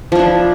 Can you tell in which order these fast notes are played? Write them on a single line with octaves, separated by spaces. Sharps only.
F3 E4 D4